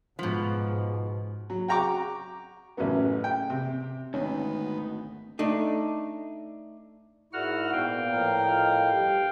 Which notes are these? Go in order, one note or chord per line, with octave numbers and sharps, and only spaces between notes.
G#2 B2 F3
F#3
F#4 G5 A#5 C#6 D6
A1 F#2 C#3 F#3 B3
G5
C3
G#1 D2 D#3 B3 C#4
A3 D4 D#4
G#2 E4 F#4 G#4 A#4 D5 F#5 F6
A#2 B3 F5 G5
A2 F3 A#4
F4 D#5
G2 G4